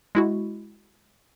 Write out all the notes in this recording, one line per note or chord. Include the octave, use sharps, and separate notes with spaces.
G#3 E4 F#4